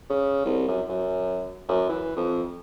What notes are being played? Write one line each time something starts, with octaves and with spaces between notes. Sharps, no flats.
C#3
C2
F#2
F#2
F#2
E3
F2